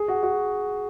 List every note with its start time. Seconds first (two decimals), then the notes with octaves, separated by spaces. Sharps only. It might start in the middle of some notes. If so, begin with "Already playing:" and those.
Already playing: G#4
0.08 F#4
0.23 F#4